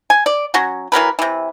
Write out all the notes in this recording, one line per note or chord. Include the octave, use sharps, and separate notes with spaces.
G#5
D5
F#3 C#4 F#4
E3 F#3 A#4 B4
C3 E3